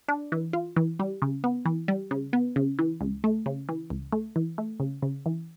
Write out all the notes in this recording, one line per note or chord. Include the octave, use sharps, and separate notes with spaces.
D4
E3
F4
E3
G3
C#3
B3
E3
G3
C#3
B3
C#3
E3
C#2
A3
C#3
E3
C#2
A3
E3
A3
C#3
C#3
E3